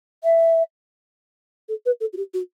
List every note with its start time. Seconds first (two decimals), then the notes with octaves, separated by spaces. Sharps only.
0.24 E5
1.69 A4
1.86 B4
2.01 A4
2.13 F#4
2.17 G4
2.34 F#4